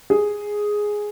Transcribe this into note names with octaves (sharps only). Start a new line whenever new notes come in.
G#4